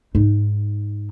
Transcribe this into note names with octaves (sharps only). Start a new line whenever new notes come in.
G#2 D#4